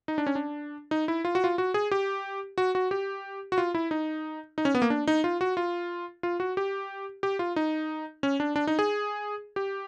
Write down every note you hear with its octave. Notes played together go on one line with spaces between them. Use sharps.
D#4
D4
C#4
D4
D#4
E4
F4
F#4
F4
F#4
G#4
G4
F#4
F#4
G4
F#4
F4
E4
D#4
D#4
C#4
B3
A#3
D4
D#4
F4
F#4
F4
F4
F#4
G4
G4
F4
D#4
C#4
D4
D4
D#4
G#4
G4